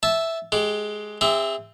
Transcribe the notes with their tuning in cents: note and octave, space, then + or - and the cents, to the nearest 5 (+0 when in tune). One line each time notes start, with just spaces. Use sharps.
E5 +0 A5 -10
G#3 +15 G4 +0
C4 -20 G#4 -40 E5 +0